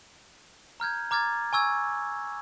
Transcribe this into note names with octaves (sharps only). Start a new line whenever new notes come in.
A#5 F6 G6 G#6
A#5 D6 F6 G#6 A6
G#5 C#6 E6 G#6